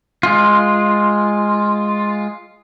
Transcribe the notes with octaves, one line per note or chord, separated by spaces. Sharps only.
G#3 F4